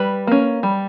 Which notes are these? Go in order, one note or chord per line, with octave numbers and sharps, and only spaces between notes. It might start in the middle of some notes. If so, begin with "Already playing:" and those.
Already playing: G3 B4
A#3 C#4
G3